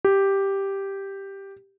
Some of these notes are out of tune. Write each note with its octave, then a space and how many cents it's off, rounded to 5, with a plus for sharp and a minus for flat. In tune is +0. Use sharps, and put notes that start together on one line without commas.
G4 +0